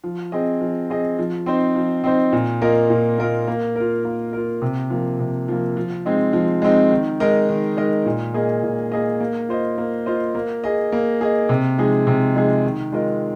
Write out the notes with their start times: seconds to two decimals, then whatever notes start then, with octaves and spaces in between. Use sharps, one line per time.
0.04 F3
0.32 C4 G#4 D#5
0.61 F3
0.90 C4 G#4 D#5
1.19 F3
1.46 C4 D#4 C5
1.75 F3
2.04 C4 D#4 C5
2.33 A#2
2.62 A#3 F4 A#4 D#5
2.90 A#2
3.18 A#3 F4 A#4 D#5
3.47 A#3
3.76 F4 A#4
4.05 A#3
4.33 F4 A#4
4.62 C3
4.90 F3 A#3
5.19 C3
5.48 F3 A#3
5.77 F3
6.06 G#3 C4 D#4
6.33 F3
6.62 G#3 C4 D#4
6.91 D#3
7.20 G#3 D#4 A#4 D#5
7.49 D#3
7.77 G#3 D#4 A#4 D#5
8.06 A#2
8.34 A#3 G#4 D#5
8.63 A#2
8.92 A#3 G#4 D#5
9.20 A#3
9.49 F4 C5 D#5
9.78 A#3
10.06 F4 C5 D#5
10.35 A#3
10.64 G#4 D#5
10.92 A#3
11.21 G#4 D#5
11.49 C3
11.78 F3 G#3 D#4 G#4
12.07 C3
12.35 F3 G#3 D#4 G#4
12.63 D#3
12.92 G#3 F4 A#4 D#5